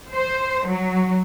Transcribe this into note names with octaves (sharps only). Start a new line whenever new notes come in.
C5
F#3